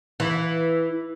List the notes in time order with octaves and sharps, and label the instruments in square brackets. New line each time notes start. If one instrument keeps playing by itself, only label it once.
[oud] E3